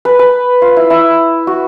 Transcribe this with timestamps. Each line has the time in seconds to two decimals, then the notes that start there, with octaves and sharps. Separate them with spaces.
0.05 B4
0.19 B4
0.62 F4
0.77 E4
0.90 E4
1.47 F#4